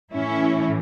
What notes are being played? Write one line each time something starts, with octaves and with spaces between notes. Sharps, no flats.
A2 E3 C#4 E4